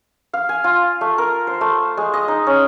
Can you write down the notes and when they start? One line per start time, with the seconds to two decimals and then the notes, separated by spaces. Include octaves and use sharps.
0.33 F5
0.49 G#5
0.64 F4
1.01 A3
1.18 A#4
1.47 C5
1.61 A3
1.97 G#3
2.14 D#5
2.28 D#4
2.47 C#4